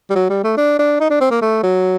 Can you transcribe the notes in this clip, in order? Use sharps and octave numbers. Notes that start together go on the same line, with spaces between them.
G3
F#3
G3
A3
D4
D4
D#4
D4
C4
A#3
A3
F#3